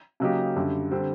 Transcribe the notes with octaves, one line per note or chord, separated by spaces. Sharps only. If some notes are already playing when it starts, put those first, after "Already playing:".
C#3 F#3 A#3 D#4 G4
F#2 D3 G3
D3 G3 C4